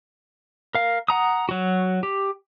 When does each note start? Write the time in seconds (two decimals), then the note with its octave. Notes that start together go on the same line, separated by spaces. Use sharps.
0.75 A#4 F5
1.08 F#5 A#5 D#6
1.49 F#3 F#4
2.03 G4